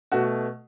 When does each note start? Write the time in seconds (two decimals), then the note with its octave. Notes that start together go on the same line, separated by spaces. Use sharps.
0.12 B2 A3 F#4